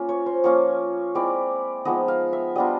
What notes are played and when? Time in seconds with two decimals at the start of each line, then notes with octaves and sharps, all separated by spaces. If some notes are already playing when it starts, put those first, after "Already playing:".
Already playing: A#3 C#4 F4
0.09 C#5
0.26 C5
0.44 F3 A#3 C#4 F4 C#5
1.15 G#3 C4 E4 D5
1.85 F3 G#3 B3 D#4 D#5
2.08 F5
2.33 E5
2.55 G3 B3 D4 F4 D#5